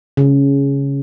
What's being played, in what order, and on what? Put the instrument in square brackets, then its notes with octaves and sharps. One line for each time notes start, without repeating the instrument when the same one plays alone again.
[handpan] C#3